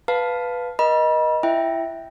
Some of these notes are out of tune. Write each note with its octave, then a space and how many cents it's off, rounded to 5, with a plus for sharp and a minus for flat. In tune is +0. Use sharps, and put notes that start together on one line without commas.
B4 +0 F5 +0 A5 +0
A#4 +40 D#5 +0 B5 -40
E4 +25 E5 +0 G5 +0